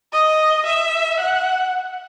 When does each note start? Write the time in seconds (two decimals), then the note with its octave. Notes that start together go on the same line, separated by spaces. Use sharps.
0.13 D#5
0.66 E5
1.20 F#5